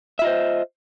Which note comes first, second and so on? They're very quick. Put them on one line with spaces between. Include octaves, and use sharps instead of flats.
E5 F4 D#5 C5